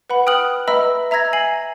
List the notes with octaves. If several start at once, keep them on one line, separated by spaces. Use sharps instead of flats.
B4 F#5 B5
G5 D#6 F6 F#6 F#7
B4 D#5 E5 A#5 B5 E6
E5 A#5 E6 G#6 A#6
G#5 C7 F#7